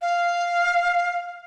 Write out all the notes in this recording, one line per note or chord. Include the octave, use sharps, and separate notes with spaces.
F5